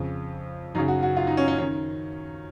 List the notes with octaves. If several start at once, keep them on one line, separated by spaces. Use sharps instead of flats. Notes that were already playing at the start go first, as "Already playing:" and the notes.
Already playing: F2 C#3
F#2 C#3 D#4
F#4
F#4
F4
D#4
C#4
C#4
D#3 C#4